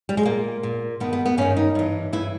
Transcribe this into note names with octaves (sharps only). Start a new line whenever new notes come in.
G3
G#3
A#2 A#3
A#2
G2 D#3 B3
B3
B3
G2 D#3 C#4
D#4
G2 E3
G2 E3 E4